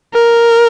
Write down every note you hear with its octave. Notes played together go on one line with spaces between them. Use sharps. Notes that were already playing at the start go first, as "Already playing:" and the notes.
A#4